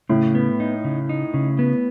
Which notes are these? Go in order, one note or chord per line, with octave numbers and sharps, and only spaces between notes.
A2 C#3
B3
D#4
C#3
D#4
C#3
B3